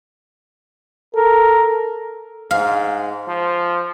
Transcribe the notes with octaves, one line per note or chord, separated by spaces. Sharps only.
A4 A#4
G#2 F5
F3